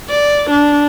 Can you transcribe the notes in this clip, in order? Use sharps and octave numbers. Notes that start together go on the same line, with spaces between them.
D5
D4